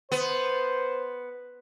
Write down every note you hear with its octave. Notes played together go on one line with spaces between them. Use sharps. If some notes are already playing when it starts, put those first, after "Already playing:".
B3 C5